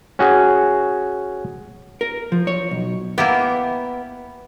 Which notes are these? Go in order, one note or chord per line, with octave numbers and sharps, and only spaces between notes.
C#4 F#4 G#4
A#4
F3
C#5
B1
A#3 B3 E4 G4